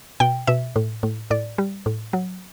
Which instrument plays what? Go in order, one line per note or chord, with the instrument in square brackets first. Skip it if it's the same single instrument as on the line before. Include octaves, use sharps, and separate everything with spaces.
[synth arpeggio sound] B2 G5
B2 E5
A2
A2
A2 D5
G3
A2
F#3